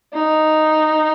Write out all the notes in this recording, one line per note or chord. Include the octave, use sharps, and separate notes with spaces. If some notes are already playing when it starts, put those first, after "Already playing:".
D#4